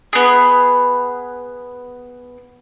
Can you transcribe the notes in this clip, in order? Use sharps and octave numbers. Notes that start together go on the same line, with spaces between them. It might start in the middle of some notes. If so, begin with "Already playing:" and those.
B3 G#4